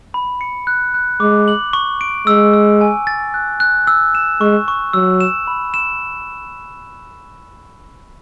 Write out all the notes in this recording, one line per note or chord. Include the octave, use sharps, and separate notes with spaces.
B5
C#7
F#6
F#6
G#3 D6
F#7
C#6
D7
G#3 E6
E6
G#5
A6
F#6
F#6
E6
E7
G#3 C#6
C#6
F#3 E6
E7
B5
E7